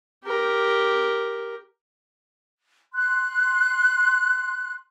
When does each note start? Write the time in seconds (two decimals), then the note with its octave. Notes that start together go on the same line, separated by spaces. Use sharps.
0.25 G4 A#4
2.93 C6 F#6